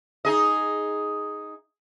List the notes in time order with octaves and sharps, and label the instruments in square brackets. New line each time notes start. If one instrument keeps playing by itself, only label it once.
[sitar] D#4 G#4 D#5